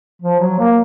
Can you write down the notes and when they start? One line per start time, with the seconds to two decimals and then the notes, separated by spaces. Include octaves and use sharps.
0.22 F3
0.40 F#3
0.59 A#3